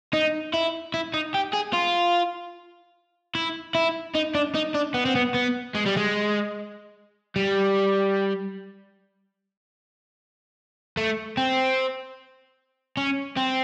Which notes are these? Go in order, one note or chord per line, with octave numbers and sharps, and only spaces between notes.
D#4
E4
E4
D#4
G4
G#4
F4
E4
E4
D#4
D4
D#4
D4
B3
C4
B3
B3
G#3
G3
G#3
G3
A3
C4
C#4
C4